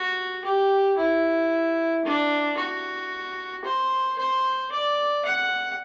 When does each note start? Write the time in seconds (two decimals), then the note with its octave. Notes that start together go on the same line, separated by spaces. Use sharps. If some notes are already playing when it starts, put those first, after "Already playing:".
Already playing: F#4
0.44 G4
0.97 E4
2.05 D4
2.58 F#4
3.64 C5
4.18 C5
4.71 D5
5.25 F#5